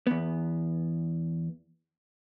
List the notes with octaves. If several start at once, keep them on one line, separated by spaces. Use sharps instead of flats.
E2 B3